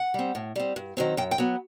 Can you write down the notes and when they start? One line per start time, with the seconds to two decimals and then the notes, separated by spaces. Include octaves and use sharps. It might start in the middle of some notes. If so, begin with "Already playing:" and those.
Already playing: F#5
0.14 G3 C4
0.35 A2
0.56 G3 C4
0.76 G2
0.97 D#3 F#3 C4
1.17 F#2 G5
1.31 G5
1.38 F#3 B3